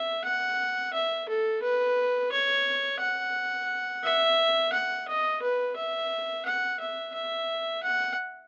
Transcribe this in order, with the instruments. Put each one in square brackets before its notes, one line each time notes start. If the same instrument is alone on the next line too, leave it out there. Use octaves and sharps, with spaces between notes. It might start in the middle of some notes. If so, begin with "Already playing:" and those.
Already playing: [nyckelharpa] E5
F#5
E5
A4
B4
C#5
F#5
E5
F#5
D#5
B4
E5
F#5
E5
E5
F#5